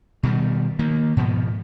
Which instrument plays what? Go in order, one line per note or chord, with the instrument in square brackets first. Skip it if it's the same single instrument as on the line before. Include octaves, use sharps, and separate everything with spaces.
[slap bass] B2 D#3 G3
D#3 A#3
G#2 B2 F3 B3